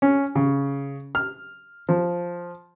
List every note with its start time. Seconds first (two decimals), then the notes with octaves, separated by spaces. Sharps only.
0.02 C#4
0.35 C#3
1.15 F6
1.89 F3